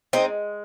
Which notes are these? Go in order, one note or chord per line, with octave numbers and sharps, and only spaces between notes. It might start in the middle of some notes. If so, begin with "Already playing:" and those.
G#3 C4 D#4